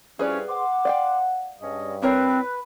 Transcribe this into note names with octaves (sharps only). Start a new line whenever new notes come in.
F2 G3 C#4 E4 F4 G#4 B4 D5
F#5 C6 D6
D5 F5 G5
G2 G#3 C#4 D#5
C4 E4 A#4 B4 C#5